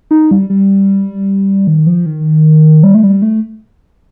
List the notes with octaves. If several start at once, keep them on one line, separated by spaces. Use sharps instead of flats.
D#4
G3
G3
D#3
F3
D#3
G3
A3
G3
A3